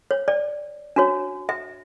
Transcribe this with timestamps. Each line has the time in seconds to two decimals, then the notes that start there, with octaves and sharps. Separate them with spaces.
0.11 C#5
0.28 D5
0.96 D4 F#4 C#5
1.49 E5